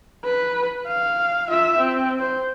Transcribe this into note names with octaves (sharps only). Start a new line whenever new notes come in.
B4
F5
F4 E5
C4
C5